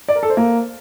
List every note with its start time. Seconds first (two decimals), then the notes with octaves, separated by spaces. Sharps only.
0.08 D5
0.16 A#4
0.23 A4
0.30 C5
0.37 A#3